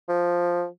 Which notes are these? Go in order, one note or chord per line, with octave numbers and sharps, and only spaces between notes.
F3